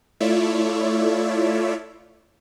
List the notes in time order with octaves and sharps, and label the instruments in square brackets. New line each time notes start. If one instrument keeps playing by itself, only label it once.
[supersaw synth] A3 E4 F4 C#5 D5 E5